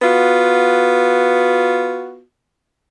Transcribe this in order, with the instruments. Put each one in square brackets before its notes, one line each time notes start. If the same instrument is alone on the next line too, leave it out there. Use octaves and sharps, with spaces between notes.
[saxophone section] B3 F4 F#4